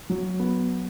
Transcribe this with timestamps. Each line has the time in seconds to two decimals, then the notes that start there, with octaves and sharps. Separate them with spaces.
0.10 F#3
0.40 B3